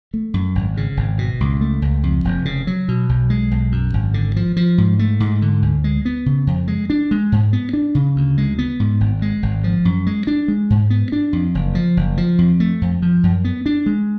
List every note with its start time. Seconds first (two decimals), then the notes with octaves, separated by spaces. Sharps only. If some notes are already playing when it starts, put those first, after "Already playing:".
0.14 A3
0.34 F#2
0.55 G#1
0.77 C#3
0.97 G#1
1.18 B2
1.40 C#2
1.61 A3
1.82 C#2
2.03 F2
2.24 F1
2.45 C#3
2.67 F#3
2.88 B2
3.09 B1
3.30 G#3
3.51 B1
3.72 F#2
3.94 G#1
4.14 D3
4.36 F3
4.56 F3
4.78 G#2
4.99 A3
5.20 G#2
5.42 D3
5.62 D2
5.84 G#3
6.05 B3
6.26 C#3
6.47 F2
6.68 G#3
6.90 D4
7.11 G#3
7.32 G#2
7.53 B3
7.73 D4
7.95 C#3
8.16 D2
8.38 G#3
8.58 B3
8.80 G#2
9.00 G#1
9.22 G#3
9.43 G#1
9.64 F3
9.85 F#2
10.07 G#3
10.27 D4
10.48 G#3
10.70 G#2
10.90 B3
11.12 D4
11.33 F2
11.55 F#1
11.75 F3
11.97 F#1
12.17 F3
12.38 F2
12.60 A3
12.81 F2
13.02 F3
13.23 F#2
13.45 B3
13.66 D4
13.86 G#3